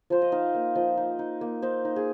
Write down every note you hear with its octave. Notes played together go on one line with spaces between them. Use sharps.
F3 C5
D#5
D#4 F5
A#3
F3 D#5
D#4
D#4
A#3
D#4 C5
D#4
G#4